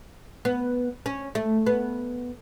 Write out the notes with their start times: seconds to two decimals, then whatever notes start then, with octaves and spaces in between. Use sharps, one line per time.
0.45 B3
1.06 C#4
1.35 A3
1.67 B3